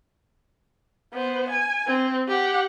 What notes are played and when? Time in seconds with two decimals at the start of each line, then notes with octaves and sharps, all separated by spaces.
1.13 B3 C5
1.49 G#5
1.87 C4
2.28 G4 F#5